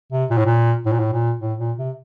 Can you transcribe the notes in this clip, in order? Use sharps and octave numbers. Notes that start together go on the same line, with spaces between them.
C3
A#2
A2
A#2
A2
A#2
A2
A#2
A2
A#2
C3